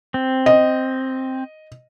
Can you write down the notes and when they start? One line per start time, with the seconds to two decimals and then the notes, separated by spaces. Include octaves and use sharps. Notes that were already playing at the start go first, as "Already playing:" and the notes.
0.14 C4
0.46 D#5